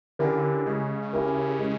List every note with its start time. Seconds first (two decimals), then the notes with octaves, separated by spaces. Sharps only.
0.19 D3 C#4 E4 G4 A#4
0.66 C#3 G#3
1.13 C#4 E4 G4 A#4
1.59 G#3